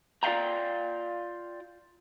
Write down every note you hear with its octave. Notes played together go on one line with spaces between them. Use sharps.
F4 D5 E5 F5 G5 A#5